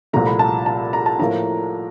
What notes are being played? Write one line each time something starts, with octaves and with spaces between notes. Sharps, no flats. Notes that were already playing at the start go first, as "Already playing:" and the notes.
C2 A#2 F3 A3 A#5
B5
A5
A5
A#5
A5
A2 F3 A#3 A#5